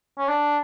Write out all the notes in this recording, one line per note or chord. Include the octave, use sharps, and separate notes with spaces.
C#4
D4